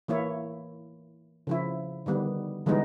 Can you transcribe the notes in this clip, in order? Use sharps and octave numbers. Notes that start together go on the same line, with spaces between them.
E3 A#3 E4 C#5
C#3 F3 E4
D3 D#3 G3 B3
D3 E3 G3 G#3 B3 D#4